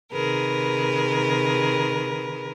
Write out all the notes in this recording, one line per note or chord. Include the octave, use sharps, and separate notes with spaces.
C3 D#3 G#4 A#4 B4